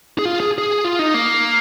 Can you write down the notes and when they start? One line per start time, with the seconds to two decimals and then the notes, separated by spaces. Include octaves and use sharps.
0.19 G#4
0.25 F4
0.40 G#4
0.58 G#4
0.84 F4
0.99 D#4
1.14 A#3